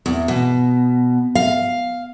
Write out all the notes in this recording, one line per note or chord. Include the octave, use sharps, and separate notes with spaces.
E2
B2
F5